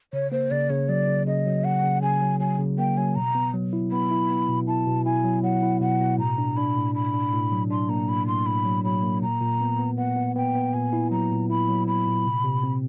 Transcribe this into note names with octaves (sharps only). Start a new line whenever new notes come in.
C#3 C#5
A#3 C5
C#3 D5
C#3 C#5
F#3 D5
C#3
C#3 D#5
F#3
C#3 F#5
C#3
C#3 G#5
F#3
F#3 G#5
C#3
A#3 G5
F#3 G#5
B2 A#5
B3
F#3
E4
B3 B5
E4
B3
B2
E4 A5
B2
E4 G#5
F#3
F#3 F#5
E4
B2 F#5
B2
A2 A#5
D4
D4 B5
A2
D4 B5
D4
A2
F#3
D4 C6
A#3 A#5
A2 B5
A2 C6
A2 B5
F#3
F#3 B5
A#3
A#2 A#5
A#2
B3
B3
B3 F#5
B3
B3 G5
B3
A#2 G#5
E4
F#3 A#5
A#2
E4 B5
F#3
F#3 B5
A#2
C3
C3
C4